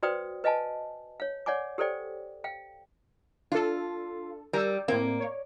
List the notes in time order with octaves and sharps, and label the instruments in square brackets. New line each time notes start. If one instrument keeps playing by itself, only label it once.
[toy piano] F#4 B4 C5 D5 G5 D#6
B4 D#5 F5 G#5 A5
C#5 F5
C#5 D5 F#5 G#5 D6
G4 A4 C5 D5 G5
F5 G5
[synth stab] D4 A4 [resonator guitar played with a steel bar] F4
[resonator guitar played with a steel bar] G3 [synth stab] A#4 E6
[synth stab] A2 C4 [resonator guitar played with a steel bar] A#3
[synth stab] C#5